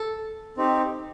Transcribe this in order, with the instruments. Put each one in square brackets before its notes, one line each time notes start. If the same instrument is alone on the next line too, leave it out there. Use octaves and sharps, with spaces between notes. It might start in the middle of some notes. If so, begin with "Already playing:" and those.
Already playing: [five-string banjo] A4
[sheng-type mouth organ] C4 D#4 G4